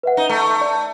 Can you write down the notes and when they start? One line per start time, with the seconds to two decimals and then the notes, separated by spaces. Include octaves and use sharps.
0.03 B4 E5 F#5
0.17 D#4
0.29 A3 A#5
0.61 D5